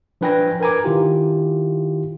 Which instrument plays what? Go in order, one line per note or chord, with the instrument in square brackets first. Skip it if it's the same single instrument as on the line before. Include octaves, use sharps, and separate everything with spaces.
[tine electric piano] F3 D4 B4 G5 G#5 A#6
A#4 B4 G#5 A#5 D6
D#3 E4 F4 G4